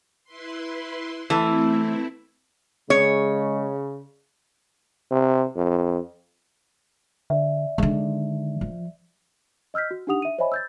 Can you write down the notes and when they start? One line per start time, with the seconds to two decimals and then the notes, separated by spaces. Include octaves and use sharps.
0.24 E4 B4 C6
1.30 E3 A3 C4 E4 A4
2.90 C#3 G#3 C#5
5.11 C3
5.56 F2
7.30 D3 D5 E5
7.78 D3 D#3 G#3
8.61 F3
9.74 D#5 E6 F6 G6 B6
9.91 F#4
10.07 D4 D#4 G4 F#5 D#6 F7
10.22 E5 D#7
10.38 C5 C#5 D#5 E5 G#5 B5
10.52 E6 G6 A6